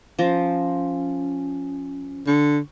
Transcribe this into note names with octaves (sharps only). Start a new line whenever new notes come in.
F3 C#4 C5 A#5
D3 C#6